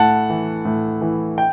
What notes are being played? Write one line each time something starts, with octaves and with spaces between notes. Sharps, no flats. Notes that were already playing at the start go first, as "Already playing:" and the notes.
Already playing: A2 F#5 A5
E3
A2
E3
G5